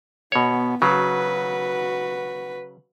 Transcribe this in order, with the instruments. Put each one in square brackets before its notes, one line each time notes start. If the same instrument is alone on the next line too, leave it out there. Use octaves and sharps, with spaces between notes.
[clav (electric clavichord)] B2 C#5 [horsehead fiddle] B3
[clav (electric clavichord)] C#3 F#3 [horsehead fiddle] F#4 B4